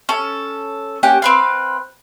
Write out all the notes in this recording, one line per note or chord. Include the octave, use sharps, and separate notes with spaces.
C#4 A4
A#3 C#4 G4 F#5
C4 B4 F5